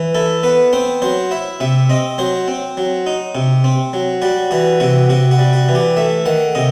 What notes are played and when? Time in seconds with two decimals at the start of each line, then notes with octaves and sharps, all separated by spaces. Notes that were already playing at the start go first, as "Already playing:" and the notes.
Already playing: E3
0.15 E4 A4
0.43 B3 B4
0.73 C4 C5
1.02 F#3 C5
1.31 E4 E5
1.60 C3 E5
1.90 C4 D#5
2.18 F#3 C5
2.48 C4
2.77 F#3
3.06 D#4
3.35 C3
3.64 C4
3.93 F#3
4.22 G3 F#4
4.51 E3 F#4
4.80 C3 F#4
5.09 C3 F#4
5.31 F#4
5.39 G3
5.53 F#4
5.68 E3
5.75 G4
5.97 A3 E5
6.26 D#3 F#5
6.55 C3 D#5